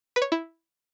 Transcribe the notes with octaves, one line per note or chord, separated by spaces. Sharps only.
B4
C#5
E4